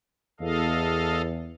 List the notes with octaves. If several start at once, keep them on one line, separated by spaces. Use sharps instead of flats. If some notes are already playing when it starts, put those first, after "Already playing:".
E2 A4 D#5 F5